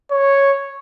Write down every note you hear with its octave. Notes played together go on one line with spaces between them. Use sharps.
C#5